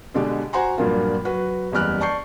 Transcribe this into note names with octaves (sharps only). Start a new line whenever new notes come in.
B2 D3 G#3 D4 G4
F#4 C5 F#5 G#5 A#5 C6
G2 A#2 F3 F#3 A#3 F4
F#3 F#4 B4
F#1 E2 G3 G4 F6 F#6
D5 A5 C#6 G6 C7